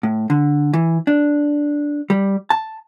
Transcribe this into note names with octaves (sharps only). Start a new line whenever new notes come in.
A2
D3
E3
D4
G3
A5